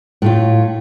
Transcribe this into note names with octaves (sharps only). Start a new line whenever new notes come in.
A2 A3 F4